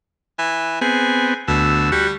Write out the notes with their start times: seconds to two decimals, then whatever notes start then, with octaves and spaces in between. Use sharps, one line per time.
0.39 E3
0.81 B3 C4 G#4
1.48 D2 B2 E6
1.92 G3 F#4